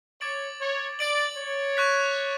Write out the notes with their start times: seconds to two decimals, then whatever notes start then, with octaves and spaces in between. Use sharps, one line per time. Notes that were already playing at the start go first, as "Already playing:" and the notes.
0.21 C#5 D6 A6 D7 F#7
0.60 C#5
0.99 D5 A6 D7 F#7
1.37 C#5
1.77 C#6 F#6 B6